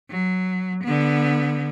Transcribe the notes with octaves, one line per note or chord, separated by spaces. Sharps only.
F#3
D3 B3